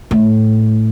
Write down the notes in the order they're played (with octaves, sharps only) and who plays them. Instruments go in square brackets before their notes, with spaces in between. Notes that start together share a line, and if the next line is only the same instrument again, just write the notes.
[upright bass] A2